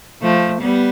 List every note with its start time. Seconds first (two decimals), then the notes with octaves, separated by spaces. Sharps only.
0.22 F3 A3
0.61 G3 B3